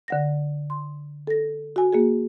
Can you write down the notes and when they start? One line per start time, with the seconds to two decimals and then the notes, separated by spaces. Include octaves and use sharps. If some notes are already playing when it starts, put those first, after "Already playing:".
0.08 D3 F#5 A#6
0.70 C6
1.27 A4 A#6
1.76 F#4 G#5
1.93 A#3 F#4 G#4